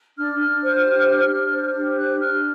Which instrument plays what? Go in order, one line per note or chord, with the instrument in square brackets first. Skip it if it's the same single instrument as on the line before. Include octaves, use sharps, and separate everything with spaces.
[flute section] D4 F6
D4
C5
G4
D4
D4
C5
G4
D4 F#6
D4 F6